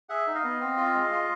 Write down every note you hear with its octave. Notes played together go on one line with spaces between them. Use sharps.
G#4 E5 F#5
D#4
D#5 F5
B3
C4
F4
G#3
F4